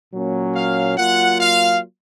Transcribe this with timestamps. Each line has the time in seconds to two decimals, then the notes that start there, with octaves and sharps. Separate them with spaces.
0.13 A#2 F#3 A#3 C#4
0.55 F5
0.97 F#3 A#3 F4 F#5
1.40 F5